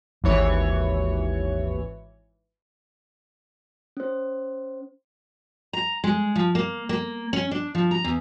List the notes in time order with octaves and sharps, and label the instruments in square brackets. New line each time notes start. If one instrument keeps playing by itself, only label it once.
[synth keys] G#1 E3 C#5 [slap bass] D#2
[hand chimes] C#4 C5
[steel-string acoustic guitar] A#5
G#3
F3
A#3
A#3
C#4
D4
F3
A#5
E2